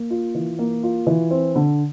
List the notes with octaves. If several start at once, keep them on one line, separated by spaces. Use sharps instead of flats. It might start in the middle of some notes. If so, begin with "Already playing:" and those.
Already playing: A#3
F4
E3
A#3
F4
E3
C4
D3